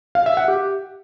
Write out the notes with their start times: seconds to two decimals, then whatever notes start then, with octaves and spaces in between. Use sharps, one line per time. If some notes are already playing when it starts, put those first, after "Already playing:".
0.15 F5
0.26 E5
0.37 F#5
0.48 G4